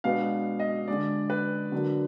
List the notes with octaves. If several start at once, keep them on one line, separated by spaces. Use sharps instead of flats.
B2 G#3 B3 D4 F5
D#5
D3 G#3 D4 D5
B4
D3 F#3 A#3 D4